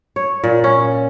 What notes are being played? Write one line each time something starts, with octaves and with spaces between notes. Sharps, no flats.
C#5
A#2
C#4